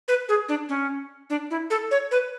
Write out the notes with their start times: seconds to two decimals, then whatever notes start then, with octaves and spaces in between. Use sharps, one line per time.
0.08 B4
0.29 G#4
0.48 D4
0.69 C#4
1.30 D4
1.50 E4
1.70 A4
1.91 C#5
2.11 B4